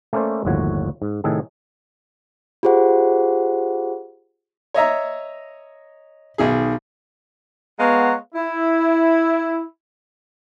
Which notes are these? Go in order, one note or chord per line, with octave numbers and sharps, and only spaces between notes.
A3 A#3 C#4 A4 C5 D5
G1 D#2 A2 F3 F#4 C#5
G#2
A2 C3 D#3 G#4 A4
F4 G4 G#4 C5 F#5
C#5 D#5 E5 A#5
B1 D#3 G#4
G#3 B3 C#5 F5 F#5 A#5
E4